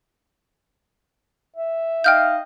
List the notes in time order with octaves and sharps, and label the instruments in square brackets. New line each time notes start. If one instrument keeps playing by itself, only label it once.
[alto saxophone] E5
[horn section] D#4 D#5 F5 [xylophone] G5 F6 G6